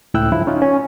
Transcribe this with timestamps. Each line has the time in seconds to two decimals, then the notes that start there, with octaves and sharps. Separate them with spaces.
0.14 C#2 A2 E4 G5 E6 F#6
0.32 G2 C#3 F3 E4
0.47 C#4 D#4 F4
0.62 C#4